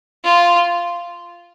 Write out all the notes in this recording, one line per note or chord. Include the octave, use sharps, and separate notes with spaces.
F4